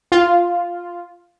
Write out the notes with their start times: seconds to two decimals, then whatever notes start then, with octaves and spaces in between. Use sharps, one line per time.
0.12 F4